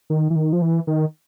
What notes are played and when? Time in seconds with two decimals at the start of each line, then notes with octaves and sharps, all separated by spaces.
0.10 D#3
0.30 E3
0.36 D#3
0.53 F3
0.62 E3
0.87 D#3